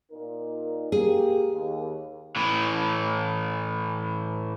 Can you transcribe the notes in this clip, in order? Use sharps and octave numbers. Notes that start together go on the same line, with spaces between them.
A#2 D#4 A#4
A#3 G4 G#4
D#2
A2 E3